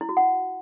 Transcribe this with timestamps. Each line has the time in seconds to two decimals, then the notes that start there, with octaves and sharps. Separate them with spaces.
0.01 E4
0.09 F#4
0.17 F#5